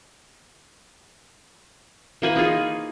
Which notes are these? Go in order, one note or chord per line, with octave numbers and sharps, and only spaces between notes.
E3 A#3 G#5 B5
D#4 F4 G#4